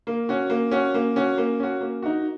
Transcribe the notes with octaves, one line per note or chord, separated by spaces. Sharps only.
A#3
C#4 F#4
A#3
C#4 F#4
A#3
C#4 F#4
A#3
C#4 F#4
A#3
D#4 F#4